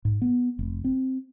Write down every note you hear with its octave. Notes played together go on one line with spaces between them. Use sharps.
G#2
B3
F1
C4